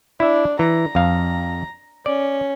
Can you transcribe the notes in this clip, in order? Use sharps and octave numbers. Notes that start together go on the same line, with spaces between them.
D4 E4 E5
E3 A#5
F2 F5
C#4 D5